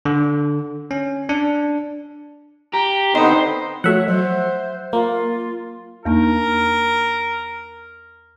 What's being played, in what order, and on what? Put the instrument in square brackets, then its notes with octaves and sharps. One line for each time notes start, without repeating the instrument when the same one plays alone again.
[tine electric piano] D3
C#4
D4
[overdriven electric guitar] G4 [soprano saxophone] A#5
[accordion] D3 B3 C4 [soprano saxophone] D#4 [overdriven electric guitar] C5 [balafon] D#5
[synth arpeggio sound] F3 A3 F#4 [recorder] C#5 [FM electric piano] E5 F#5
[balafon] F#3 [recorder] C5
[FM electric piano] A#3 [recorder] F4
[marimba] E2 A#3 D#4 [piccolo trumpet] A#4